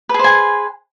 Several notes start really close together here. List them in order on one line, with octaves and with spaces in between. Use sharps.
B4 G#4 C5 G#5